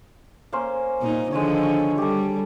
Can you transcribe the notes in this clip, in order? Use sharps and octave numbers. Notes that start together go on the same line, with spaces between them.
A#3 C#4 C5
A#2 D#4
D3 D#3 F3 G#3 C#5
C#6
G3 G4 A4